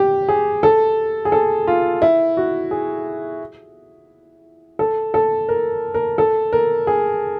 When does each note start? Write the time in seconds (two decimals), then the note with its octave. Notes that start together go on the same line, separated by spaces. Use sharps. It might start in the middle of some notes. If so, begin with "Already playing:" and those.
Already playing: G4
0.28 G#4
0.63 A4
1.25 G#4
1.32 A4
1.67 F4
2.02 E4
2.37 F#4
2.71 G#4
4.79 A4
5.14 A4
5.49 A#4
5.94 A#4
6.18 A4
6.53 A#4
6.87 G#4